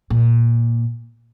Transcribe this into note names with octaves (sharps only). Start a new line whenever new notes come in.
A#2